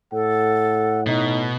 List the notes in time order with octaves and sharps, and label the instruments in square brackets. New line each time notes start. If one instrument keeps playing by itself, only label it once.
[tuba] A2 [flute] A4 [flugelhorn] F#5
[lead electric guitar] B2 [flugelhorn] D#4